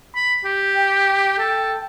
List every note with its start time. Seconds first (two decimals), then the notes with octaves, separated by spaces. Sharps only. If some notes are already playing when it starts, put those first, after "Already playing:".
0.16 B5
0.45 G4
0.75 G5
1.39 A4